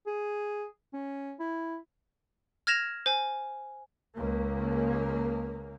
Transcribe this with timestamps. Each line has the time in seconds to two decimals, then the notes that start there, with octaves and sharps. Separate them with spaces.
0.06 G#4
0.93 C#4
1.39 E4
2.67 F6 G#6 A#6 E7 F7
3.06 C5 G#5
4.17 C#2 A#3